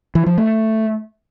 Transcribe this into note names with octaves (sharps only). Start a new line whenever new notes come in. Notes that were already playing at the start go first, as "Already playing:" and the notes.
E3
F3
A3